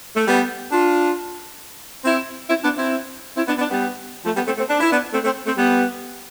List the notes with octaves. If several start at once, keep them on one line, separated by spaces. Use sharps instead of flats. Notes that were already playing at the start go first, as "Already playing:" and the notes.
A3
G3 B3
D4 F4
C4 E4
C4 E4
B3 D4
C4 E4
C4 E4
B3 D4
B3 D4
G3 B3
F3 A3
G3 B3
A3 C4
A3 C4
D4
E4
B3 D4
A3 C4
A3 C4
A3 C4
G3 B3